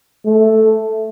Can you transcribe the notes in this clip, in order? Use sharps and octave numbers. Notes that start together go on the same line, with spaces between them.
A3